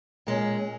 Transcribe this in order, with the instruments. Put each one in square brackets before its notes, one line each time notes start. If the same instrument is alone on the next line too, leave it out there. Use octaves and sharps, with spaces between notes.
[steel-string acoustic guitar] A#2 G#3 C#4